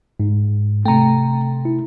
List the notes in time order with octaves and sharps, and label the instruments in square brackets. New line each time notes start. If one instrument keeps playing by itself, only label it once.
[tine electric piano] G#2
[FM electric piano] C3 A3 [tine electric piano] G5 A#5
[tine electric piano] E4